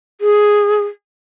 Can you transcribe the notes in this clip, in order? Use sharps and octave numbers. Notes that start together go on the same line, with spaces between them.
G#4